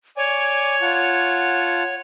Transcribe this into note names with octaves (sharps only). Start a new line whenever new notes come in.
C#5 D5 G#5
F4 F#5 A5